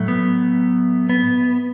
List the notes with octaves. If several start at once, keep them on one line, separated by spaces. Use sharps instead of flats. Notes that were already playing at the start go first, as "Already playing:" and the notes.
Already playing: A2 F#3 A3
B3
B3